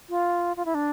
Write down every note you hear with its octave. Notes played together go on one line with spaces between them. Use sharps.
F4
F4
E4
D4